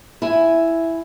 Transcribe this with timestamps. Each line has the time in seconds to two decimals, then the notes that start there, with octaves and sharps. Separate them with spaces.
0.22 E4 G#5